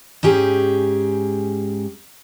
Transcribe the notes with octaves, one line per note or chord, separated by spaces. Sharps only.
G#2 C#4 G4 G#4